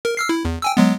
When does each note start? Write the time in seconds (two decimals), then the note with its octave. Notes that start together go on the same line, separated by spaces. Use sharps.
0.05 A#4
0.17 E6 F6 C7
0.29 E4
0.45 E2
0.62 G5 G#5 E6
0.77 F#3 G#3 B3